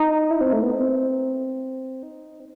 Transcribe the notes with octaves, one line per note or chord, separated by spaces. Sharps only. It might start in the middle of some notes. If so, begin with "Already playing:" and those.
Already playing: D#4
E4
C4
A3
B3
C4
D#4
C4